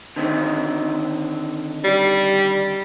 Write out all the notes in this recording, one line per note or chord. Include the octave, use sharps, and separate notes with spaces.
D3 D#3 C4
G3